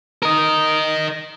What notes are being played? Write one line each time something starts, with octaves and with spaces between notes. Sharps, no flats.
A#4 D#5